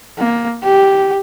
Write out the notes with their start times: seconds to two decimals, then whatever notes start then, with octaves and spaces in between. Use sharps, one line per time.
0.19 A#3
0.64 G4